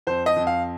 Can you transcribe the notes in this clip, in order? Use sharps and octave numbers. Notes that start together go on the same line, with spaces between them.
F2 C5
D#5
F2
F5